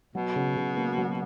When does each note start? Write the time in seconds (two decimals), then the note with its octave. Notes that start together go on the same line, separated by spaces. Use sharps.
0.15 B2 F#3
0.36 C#3
0.56 C#3
0.77 A#3
0.98 F#3